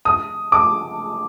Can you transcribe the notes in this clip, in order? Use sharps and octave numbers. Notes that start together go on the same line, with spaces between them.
D#6
D6